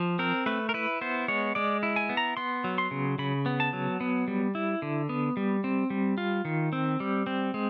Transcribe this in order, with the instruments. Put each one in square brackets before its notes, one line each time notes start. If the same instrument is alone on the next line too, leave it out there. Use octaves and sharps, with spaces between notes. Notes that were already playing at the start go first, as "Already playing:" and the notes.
Already playing: [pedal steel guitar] F3
C4 A#4
A3 B4
A#4
E4 B4
B3 C5
G#3 C#5
G#3 D5
E4
G#5
B3
A#5
B3 C6
F#3
C6
C#3
C#3 B5
B3
A5
F#3
B3
G3
E4
D3
B3
G3
C4
G3
F4
D#3
C4
G3
C4
G#3